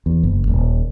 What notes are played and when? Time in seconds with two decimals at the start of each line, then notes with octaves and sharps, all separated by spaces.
0.06 E2
0.23 F#1
0.47 D#1